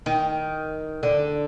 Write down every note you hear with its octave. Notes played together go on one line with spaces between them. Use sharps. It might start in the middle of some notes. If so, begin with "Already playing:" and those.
D#3
D3